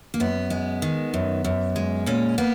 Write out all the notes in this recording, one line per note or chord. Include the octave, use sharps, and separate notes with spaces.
A#3
F#2 B3
G#3
D#3
F#2
F#2
G#3
A#2 C#4
A#3 B3